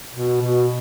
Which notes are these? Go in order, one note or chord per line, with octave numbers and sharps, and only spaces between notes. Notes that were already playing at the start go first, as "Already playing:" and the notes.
B2
B2